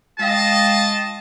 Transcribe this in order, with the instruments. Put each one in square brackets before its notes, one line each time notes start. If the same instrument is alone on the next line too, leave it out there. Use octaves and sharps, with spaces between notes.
[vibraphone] G#3 F5 G5 [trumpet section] F4 D#5 A5